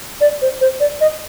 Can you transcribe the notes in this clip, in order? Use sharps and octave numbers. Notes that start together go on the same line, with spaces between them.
D5
C5
C5
D5
D#5